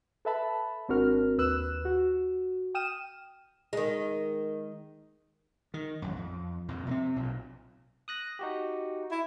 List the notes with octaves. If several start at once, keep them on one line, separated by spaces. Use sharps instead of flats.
A4 B4 E5 A5 B5
G#1 C4 D4 F#4 A#4 F6
D#2 B4 E6 F#6 E7
F#4
G5 D#6 F6 D#7 E7
D#3 G#3
D#3
A1 F#2
F2
F2 A#2
C3 A#3 C4
B1 A#2
D#6 F#6 A#6
D#4 F#4 G4
E4